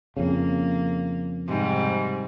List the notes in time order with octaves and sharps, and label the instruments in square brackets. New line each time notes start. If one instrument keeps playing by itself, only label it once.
[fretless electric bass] F2 C#3 [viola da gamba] A#3
[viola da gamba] G#2 C3 G3